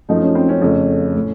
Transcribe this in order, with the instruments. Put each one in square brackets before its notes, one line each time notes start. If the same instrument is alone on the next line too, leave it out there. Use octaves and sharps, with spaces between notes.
[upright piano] F#2 F3 A3 D#4
C#4
C4
C#4
F2 C#3 A3
A2